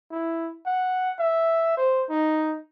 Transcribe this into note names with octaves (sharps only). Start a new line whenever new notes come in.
E4
F#5
E5
C5
D#4